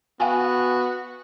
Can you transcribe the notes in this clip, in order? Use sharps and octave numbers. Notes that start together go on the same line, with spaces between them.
B3 F#4 F5 G5 G#5